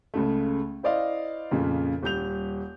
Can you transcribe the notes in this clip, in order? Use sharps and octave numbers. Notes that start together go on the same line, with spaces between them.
C#2 C#3 A3
E4 C5 D5 D#5 F5
F2 A#2 C#3
D#1 G3 G6 F7